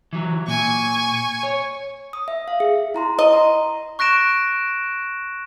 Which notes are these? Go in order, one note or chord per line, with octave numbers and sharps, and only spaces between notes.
E3 F#3
A#2 G#5 C#6
C#5
D#6
E5
F5
G#4
E4 A#5 C6
D#5
A#5 C6
C#6 F#6 A#6 D7 E7